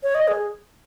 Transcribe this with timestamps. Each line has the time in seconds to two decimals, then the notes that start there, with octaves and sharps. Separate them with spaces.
0.03 C#5
0.15 D#5
0.28 G#4